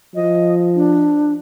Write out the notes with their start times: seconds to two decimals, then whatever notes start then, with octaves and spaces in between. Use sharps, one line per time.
0.15 F3 D#5
0.75 D4